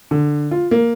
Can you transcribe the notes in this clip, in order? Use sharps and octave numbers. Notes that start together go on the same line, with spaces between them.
D3
F4
A#3